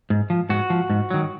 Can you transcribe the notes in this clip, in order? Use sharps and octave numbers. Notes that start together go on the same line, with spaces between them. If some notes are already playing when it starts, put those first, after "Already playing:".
G#2
F3
G#2 F#4
F3
G#2
D#3 F#3